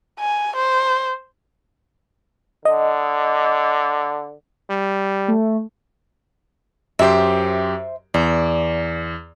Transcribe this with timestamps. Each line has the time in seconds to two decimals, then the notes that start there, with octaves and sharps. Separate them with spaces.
0.20 G#5
0.56 C5
2.65 D3 D#5
4.70 G3
5.28 A3
6.99 F#2 G4 C5 E5
8.14 E2 D5